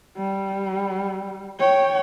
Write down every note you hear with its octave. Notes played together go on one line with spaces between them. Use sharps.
G3
C#5 G5